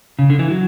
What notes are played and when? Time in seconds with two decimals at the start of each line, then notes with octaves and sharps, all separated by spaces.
0.19 C#3
0.30 D3
0.39 E3
0.50 F#3